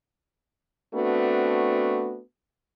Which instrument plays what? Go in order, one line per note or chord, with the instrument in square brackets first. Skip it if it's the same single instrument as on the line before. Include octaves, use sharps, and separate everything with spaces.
[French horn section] A3 B3 C4 D4 F#4